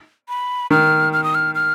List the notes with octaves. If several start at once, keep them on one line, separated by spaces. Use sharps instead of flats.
B5
D#3 F6
F6
D#6
F6
F6